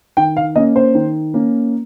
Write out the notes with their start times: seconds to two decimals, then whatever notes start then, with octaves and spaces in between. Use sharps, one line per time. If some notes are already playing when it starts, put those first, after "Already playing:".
0.17 D#3 G5
0.37 F5
0.56 A#3 C#4 D#5
0.76 C5
0.95 D#3
1.34 A#3 C#4